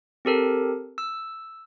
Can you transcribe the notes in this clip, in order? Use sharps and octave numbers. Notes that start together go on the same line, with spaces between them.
C4 G4 A4 A#4
E6